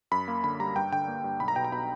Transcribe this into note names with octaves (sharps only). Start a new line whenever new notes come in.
F#2 B5
A#3
D3 B5
G3 A#5
G2 G5
D3 G5
A#3
G2
B1 B5
A#5
B2 G5
A#5
B2 B5